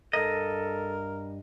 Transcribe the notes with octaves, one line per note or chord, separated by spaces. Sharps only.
G2 A4 A#4 D#5